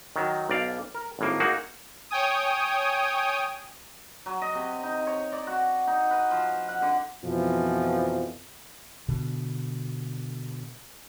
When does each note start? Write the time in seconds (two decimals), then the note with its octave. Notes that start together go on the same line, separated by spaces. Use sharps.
0.16 D#3 F#3
0.50 B1 D5 F5
0.94 A#4
1.19 G#1 A2 A#3
1.40 A#3 D#4 F#4 G#4
2.11 C#5 G5 G#5 D#6
4.26 F#3
4.42 D#5
4.55 C3
4.83 D#4
5.07 C#5
5.32 D5
5.47 F#4
5.87 D#4
6.11 B4
6.31 F3
6.68 F#5
6.82 D3
7.24 F2 B2 E3 F3
9.08 B2 D3